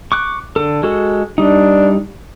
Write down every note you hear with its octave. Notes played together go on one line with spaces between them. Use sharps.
C#6 D6 F#6
D3 A4
G#3 F#4 A4
G3 D4 D#4